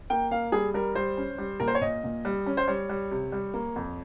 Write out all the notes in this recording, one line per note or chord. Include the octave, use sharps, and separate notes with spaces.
A#3 G5
A#3 F5
G3 G#4
G3 A#4
G3 C5
C#4
G3
A#2 A#4
C5
C#5
A#2 D#5
A#2
G3
C#4
C5
G3 C#5
G3
C3
G3
A#3
F2